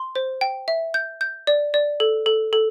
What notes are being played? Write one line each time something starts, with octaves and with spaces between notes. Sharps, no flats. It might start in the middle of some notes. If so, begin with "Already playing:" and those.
Already playing: C6
C5
G5
E5
G6
G6
D5
D5
A4
A4
A4